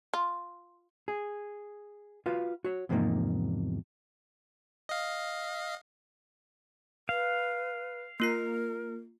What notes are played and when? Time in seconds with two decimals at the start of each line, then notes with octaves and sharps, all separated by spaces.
0.14 F4
1.08 G#4
2.26 F4 F#4 B4 F5
2.64 F#4 C#5
2.89 E2 G#2 C3 F3 A#3 D#4
4.89 D#5 F5
7.09 B4 F5
8.20 A#3 F4 A#4 C7